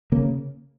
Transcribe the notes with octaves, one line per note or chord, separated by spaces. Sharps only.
C#3 A#3